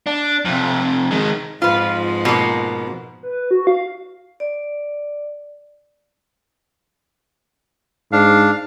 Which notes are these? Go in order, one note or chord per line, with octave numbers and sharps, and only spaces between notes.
D4
F2 C3
D#3 G#3
F2 G#2 F3 F4 B4
B2 A#3
B4
F#4
F5
D5
G#2 D4 F5